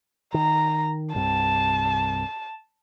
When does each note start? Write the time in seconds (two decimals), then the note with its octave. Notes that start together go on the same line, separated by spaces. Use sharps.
0.34 D#3 A#5
1.15 C2 G2 C3 A5